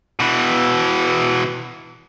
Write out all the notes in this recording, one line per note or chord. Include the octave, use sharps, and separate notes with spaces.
B2 E3